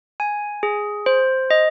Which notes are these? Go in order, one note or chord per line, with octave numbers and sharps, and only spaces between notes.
G#5
G#4
C5
D#5